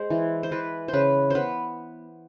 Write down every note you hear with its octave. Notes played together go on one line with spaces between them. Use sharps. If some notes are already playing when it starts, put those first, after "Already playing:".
Already playing: G#3 C5
E3
C5
E3 B4
C5
C#3 B4
B3 B4 C5